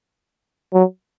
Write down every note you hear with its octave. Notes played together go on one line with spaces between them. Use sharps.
F#3